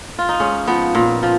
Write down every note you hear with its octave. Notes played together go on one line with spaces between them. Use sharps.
F4
D#4
G#2 C#4
F3 B3
A#2
F3